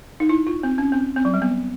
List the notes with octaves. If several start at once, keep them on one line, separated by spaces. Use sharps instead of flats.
D#4
E4
F4
C4
C#4
C4
C4
F#3
G3
B3